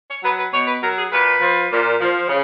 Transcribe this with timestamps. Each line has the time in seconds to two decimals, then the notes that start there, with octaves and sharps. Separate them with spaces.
0.09 C#5
0.23 F#3 B4
0.38 B4
0.53 B2 C#5
0.67 B4
0.82 F#3 A#4
0.97 G#4
1.11 A#2 B4
1.41 F3
1.71 A#2
2.00 F3
2.29 C#3